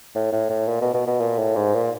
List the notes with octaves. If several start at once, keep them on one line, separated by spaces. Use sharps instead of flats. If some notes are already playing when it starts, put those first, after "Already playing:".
A2
A2
A2
A#2
B2
B2
B2
A#2
A2
G#2
A#2